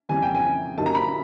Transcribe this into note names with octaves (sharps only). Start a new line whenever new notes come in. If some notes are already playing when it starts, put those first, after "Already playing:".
F2 C#3 E3 G3 G#5
G5
G#5
G2 D3 F#3 A#3 D#4 A5
A#5
B5